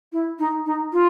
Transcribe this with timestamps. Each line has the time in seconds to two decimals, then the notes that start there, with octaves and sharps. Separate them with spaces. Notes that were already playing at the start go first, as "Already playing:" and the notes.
0.12 E4
0.39 D#4
0.66 D#4
0.93 F4